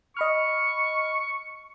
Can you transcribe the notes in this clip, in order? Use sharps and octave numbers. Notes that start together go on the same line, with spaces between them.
D#5 B5 C#6 F6